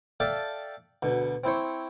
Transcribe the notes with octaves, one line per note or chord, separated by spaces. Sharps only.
A4 D5 E5 F5 G5 A5
D2 B2
C4 E4 C5 C#5